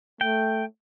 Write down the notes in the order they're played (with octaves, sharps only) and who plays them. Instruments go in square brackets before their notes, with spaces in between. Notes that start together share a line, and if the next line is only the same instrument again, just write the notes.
[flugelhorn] A3 [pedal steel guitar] G5